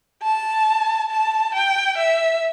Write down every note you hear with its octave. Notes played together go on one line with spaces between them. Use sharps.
A5
A5
G5
E5